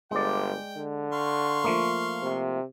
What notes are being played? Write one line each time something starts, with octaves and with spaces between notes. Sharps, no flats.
G1 G#3 D5 G5
D3
F5 C6 C#6
F3 A3 A#3
C3